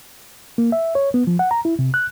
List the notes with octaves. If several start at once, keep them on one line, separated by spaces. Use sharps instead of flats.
A#3
E5
C#5
B3
F3
F#5
A#5
E4
C3
F#6